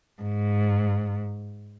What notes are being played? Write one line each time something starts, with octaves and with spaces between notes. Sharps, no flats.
G#2